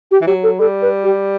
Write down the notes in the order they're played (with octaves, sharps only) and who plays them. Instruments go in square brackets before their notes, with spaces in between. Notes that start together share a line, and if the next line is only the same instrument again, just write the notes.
[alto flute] G4
[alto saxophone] E3
[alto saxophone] F#3 [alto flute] G4
[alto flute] A4
[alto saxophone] G3 [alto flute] A4
[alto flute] B4
G4